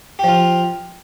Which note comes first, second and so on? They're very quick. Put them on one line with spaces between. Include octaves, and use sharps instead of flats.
G4 F3 F4